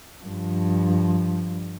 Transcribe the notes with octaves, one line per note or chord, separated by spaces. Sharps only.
G2 F3